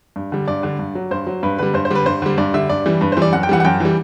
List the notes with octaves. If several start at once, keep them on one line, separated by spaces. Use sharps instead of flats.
G2
D3 G3
G2 D5
D3 G3
G2
F#3
G2 C5
F#3
G2 B4
D3 G3 B4
G2 C5
C5
D3 G3 B4
G2 C5
D3 G3
G2 D5
D3 G3 E5
G2 D5
E3 G3
G2 B4
C5
E3 G3 D5
F#2 F#5
G5
E3 G3 F#5
F#5
F#2 G5
E3 G3